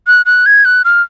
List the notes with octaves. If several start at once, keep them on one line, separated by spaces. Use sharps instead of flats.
F#6
F#6
G#6
F#6
F6